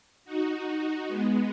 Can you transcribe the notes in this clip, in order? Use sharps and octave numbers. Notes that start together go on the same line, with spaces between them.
D#4 F#4
G#3 B3